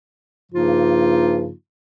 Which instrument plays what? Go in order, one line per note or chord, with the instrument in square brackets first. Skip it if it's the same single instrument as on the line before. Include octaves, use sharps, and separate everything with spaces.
[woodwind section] G2 C#3 F3 A#3 D#4 F4